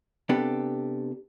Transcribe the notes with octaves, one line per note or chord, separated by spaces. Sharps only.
C3 B3 D4 G4 A4